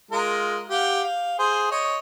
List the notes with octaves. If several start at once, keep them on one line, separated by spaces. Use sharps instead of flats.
G#3 F4 A#4
G4 F5 F#5
F5
G#4 C5
C#5 D#5